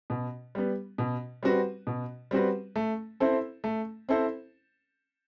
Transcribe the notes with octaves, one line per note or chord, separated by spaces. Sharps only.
B2
G3 B3
B2
G3 C4 F#4 B4
B2
G3 C4 F#4 B4
A3
C4 E4 A4 C5
A3
C4 E4 A4 C5